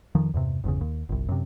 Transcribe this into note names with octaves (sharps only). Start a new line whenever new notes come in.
F2 D#3 F3
E2 G2 C3
G1 E2 C#3
D#2
G1 C2
F#2 C3